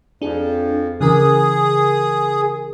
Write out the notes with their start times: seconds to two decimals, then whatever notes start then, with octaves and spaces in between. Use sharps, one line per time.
0.22 F2 D4 G#4
1.01 C#3 E3 G#4 A#4 D#6